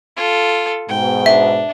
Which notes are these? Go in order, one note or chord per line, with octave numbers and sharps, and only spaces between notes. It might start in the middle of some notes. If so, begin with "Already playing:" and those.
F4 A4
G#2 B2 G5
D4 E5